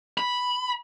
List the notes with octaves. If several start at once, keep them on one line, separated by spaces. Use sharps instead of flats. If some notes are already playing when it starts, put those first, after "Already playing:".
B5